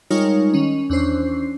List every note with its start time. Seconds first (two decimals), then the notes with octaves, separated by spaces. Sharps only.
0.10 G3 G#3 D#4 F4 A#4 C#5
0.53 D#3 C#4
0.90 E2 C#4 D4 C5 C7